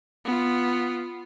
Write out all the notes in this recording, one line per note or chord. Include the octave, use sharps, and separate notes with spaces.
B3 F4